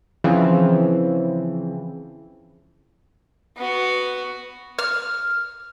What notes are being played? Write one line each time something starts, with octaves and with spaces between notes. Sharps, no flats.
C#3 E3 F3 C4
B3 F#4
F6